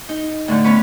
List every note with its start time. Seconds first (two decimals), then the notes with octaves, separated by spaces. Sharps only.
0.09 D#4
0.48 A2 D3 A3
0.64 B3 C#4 B4 C#5